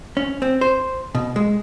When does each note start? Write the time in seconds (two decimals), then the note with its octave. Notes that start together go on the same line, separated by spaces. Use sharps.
0.17 C#4
0.42 C4
0.61 C5
1.15 B2
1.36 G#3